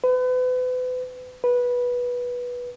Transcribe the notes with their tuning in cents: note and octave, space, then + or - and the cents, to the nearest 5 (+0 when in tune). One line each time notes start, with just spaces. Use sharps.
B4 +35
B4 -15